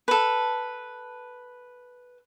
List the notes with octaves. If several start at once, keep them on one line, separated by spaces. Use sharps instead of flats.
A4 B4